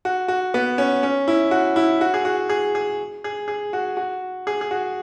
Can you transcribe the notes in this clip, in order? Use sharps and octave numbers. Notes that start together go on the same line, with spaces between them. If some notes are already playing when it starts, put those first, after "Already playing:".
F#4
F#4
B3
C#4
C#4
E4
F#4
E4
F#4
G#4
F#4
G#4
G#4
G#4
G#4
F#4
F#4
G#4
G#4
F#4